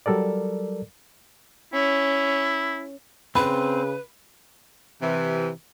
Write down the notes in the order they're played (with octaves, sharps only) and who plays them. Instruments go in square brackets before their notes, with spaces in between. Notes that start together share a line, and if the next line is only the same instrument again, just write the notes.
[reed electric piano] F#3 G3 A4 A#4 D5
[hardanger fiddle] C#4 [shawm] E4
[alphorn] C#3 [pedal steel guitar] C4 [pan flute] B4 [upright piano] B5
[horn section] C3 E3